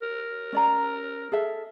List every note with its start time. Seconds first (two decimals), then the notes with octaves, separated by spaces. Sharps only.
0.02 A#4
0.53 C#4 D5 A#5
1.32 G#4 A4 E5